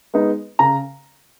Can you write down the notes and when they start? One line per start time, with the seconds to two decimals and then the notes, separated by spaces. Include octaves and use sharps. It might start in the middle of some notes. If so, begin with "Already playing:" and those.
0.14 G#3 B3 D#4
0.59 C#3 A#5